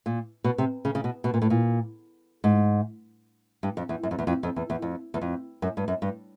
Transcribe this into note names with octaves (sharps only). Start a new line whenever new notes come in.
A#2
B2
C3
C#3
C#3
B2
B2
A#2
A2
A#2
G#2
G2
F2
E2
F#2
F2
E2
F2
F2
E2
E2
F2
E2
F2
F#2
G2
F#2
G2